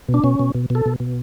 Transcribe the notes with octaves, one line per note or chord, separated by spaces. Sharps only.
B2
D4
B2 C#4
B2
B2
B2 A4
B2
B2